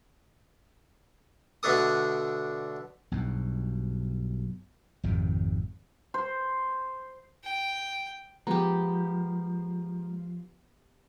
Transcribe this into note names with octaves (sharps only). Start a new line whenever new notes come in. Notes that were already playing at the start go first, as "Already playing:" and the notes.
B2 D3 A3 D4 A4 D#6
B1 G2 B2
G#1 F2 C3 D#3
C5
G5
F3 G#3 B3 G4 A#5